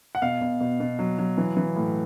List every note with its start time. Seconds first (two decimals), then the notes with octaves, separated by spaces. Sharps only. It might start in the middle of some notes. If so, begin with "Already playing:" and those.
0.15 F#5
0.22 B2 F5
0.41 B2
0.60 B2
0.80 B2
0.99 F#3
1.18 F#3
1.38 E3
1.57 E3
1.76 A2